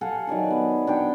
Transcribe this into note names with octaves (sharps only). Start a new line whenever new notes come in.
A4 F5 F#5 G#5
D#3 F#3 D5 G#5
B3
D4 C#5 G5